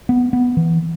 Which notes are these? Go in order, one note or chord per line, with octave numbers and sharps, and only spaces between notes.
B3
B3
E3